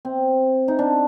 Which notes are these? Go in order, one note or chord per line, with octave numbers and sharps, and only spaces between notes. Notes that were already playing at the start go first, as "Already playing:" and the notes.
C4
D#4
D4